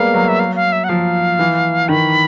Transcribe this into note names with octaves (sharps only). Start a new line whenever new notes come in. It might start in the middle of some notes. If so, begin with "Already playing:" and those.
Already playing: G3 G#3 A#3 B3 F5
F#3
E5
F5
F5
E5
F#5
F3 F5
E3
D#3 B5